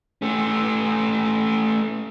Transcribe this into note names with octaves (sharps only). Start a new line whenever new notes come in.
A3 C#4